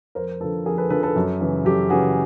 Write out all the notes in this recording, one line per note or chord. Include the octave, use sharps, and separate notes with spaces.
F2 A#4 C5
D3 F3 A4 B4
F2 G#4 A#4
A4 B4
D3 F3 A4 B4
A4 B4
F#2
C#3 E3
F#2 G4 A4
C#3 E3 F#4 G#4